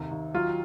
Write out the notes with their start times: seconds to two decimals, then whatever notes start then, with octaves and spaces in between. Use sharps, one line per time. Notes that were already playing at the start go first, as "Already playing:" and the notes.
Already playing: D#2 C3
0.11 D#2
0.34 F#3 F4